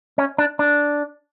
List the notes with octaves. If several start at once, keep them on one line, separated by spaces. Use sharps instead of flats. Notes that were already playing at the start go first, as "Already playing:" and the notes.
C#4
D4
D4